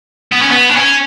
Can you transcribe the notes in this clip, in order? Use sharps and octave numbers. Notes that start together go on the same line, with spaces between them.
B3
C#4
B3
D4
C#4